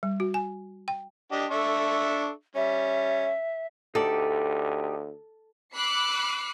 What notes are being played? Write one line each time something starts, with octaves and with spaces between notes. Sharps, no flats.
G3
F#4
G#5
G5
D4 G4 D#5
D4 A4 E5 C#6
G3 C#4 E5
D2 D#4 G4 A4 D5
B5 D6 E6 F#6 C7 C#7